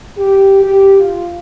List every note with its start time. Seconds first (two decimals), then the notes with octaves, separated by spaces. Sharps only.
0.17 G4
0.62 G4
0.99 F4